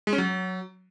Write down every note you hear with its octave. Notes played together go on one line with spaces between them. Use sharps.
G#3
C#4
F#3